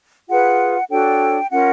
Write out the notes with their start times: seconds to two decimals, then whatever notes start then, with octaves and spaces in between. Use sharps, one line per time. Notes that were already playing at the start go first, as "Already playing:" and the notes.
0.28 F4 G#4 B4 F#5
0.90 D4 F#4 A4 C#5 G5
1.50 C#4 F4 A#4 F#5